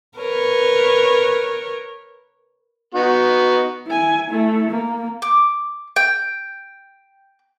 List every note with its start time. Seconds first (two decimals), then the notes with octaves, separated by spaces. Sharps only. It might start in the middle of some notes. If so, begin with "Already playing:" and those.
0.18 A#4 B4 C#5
2.94 B3 D#4 F#4
3.87 E4 G#5
4.30 A3 E4
4.70 A#3
5.22 D6
5.96 G5